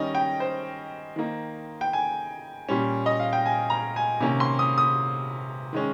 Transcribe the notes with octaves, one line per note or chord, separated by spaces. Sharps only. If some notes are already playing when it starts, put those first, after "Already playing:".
Already playing: D#3 G3 C#4 D#5
G5
C5
D#3 A#3 D#4
G5
G#5
A#2 G3 C#4
D#5
F5
G5
G#5
A#5
G#5
C3 D#3 A#3 C#4
C6
D#6
D#6
D#3 G#3 C#4